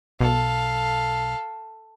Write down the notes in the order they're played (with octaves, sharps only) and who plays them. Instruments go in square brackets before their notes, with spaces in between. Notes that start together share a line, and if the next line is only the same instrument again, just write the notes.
[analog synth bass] B1 [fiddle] A4 F5